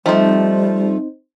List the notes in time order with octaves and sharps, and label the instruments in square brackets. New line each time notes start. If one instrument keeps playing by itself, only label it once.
[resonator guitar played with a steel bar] F3 A3 [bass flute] G3 [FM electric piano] C4 D#4 C5